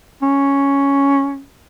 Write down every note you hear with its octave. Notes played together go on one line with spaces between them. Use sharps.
C#4